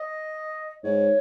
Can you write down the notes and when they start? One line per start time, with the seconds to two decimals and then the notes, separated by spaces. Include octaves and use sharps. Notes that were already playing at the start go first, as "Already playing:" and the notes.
Already playing: D#5
0.84 G#2 C#5